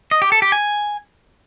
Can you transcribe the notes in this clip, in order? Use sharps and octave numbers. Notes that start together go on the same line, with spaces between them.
D#5
G4
A4
G4
G#5